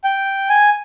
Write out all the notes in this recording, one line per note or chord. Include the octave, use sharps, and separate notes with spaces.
G5
G#5